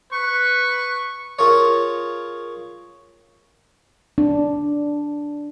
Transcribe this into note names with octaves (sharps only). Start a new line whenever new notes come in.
B4 C#6
F4 G#4 A#4 C#5
D4